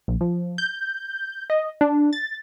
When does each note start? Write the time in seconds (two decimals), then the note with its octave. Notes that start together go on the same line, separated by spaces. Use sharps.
0.08 A#1
0.21 F3
0.58 G6
1.50 D#5
1.81 D4
2.13 A6